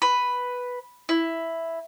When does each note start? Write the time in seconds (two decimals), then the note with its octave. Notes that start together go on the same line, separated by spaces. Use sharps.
0.02 B4
1.09 E4